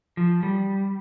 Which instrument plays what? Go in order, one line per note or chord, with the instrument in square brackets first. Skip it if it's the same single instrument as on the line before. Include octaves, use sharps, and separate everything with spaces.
[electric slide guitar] F3
G3